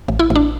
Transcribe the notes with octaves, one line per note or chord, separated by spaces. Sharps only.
A1
E4
A1
D4